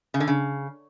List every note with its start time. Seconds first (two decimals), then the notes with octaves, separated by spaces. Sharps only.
0.14 C#3
0.20 D3
0.28 C#3